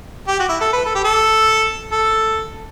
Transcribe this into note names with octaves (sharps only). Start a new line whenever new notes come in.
G4
F#4
E4
A4
B4
A4
G4
A4
A4